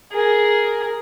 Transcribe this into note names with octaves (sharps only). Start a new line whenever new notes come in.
G#4 A#4